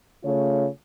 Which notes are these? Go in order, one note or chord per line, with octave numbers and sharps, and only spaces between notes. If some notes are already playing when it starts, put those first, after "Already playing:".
C#3 A3 F4 C#5